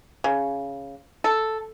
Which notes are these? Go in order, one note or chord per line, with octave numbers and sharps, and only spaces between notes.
C#3
A4